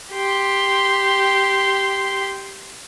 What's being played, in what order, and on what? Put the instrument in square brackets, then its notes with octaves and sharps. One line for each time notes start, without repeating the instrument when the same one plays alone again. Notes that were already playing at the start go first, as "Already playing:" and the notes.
[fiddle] G4 C6